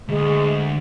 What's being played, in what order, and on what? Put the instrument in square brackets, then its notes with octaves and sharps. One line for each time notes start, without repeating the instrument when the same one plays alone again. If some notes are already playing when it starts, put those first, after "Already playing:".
[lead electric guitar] D2 [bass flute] G#3